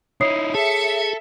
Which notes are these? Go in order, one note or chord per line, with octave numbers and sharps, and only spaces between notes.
D#4 E4 C#5 D#6 C7
G#4 A4 E5 C#7